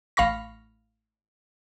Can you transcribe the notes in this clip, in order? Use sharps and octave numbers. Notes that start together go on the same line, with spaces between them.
A1 F5 B5 C#6 A#6